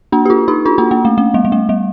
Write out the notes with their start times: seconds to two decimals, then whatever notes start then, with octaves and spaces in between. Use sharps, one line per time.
0.12 A#3 D4
0.25 G4
0.30 D4 F4
0.48 D#4 G4
0.65 D4 F4
0.78 A#3 D4
0.91 A#3
1.05 A3
1.18 A3
1.34 G3
1.45 G3
1.52 A3
1.69 G3